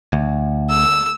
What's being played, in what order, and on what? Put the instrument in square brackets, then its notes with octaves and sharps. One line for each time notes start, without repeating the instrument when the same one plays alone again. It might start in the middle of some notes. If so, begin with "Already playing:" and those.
[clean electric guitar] D2
[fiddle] E6